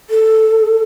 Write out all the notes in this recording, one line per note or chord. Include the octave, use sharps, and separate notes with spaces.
A4